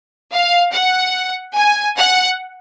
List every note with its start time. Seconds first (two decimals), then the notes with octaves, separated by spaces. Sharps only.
0.32 F5
0.73 F#5
1.55 G#5
1.98 F#5